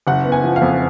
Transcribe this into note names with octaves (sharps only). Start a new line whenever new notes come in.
F#1 F#5
B3
G#5
F3
F5
F2